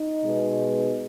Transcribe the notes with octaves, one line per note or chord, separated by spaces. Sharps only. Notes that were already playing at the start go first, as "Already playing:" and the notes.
Already playing: D#4
B2 G#3 B3